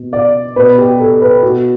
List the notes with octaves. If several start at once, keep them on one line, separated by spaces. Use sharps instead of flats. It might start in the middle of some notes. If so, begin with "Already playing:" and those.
Already playing: B2
D5
B2 B4
G4
A4
B4
B2 F#4